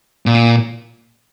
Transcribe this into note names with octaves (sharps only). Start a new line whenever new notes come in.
A#2